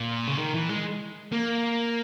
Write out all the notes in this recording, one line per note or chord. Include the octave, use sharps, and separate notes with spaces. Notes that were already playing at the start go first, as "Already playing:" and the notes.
Already playing: A#2
C#3
D#3
E3
G#3
A#3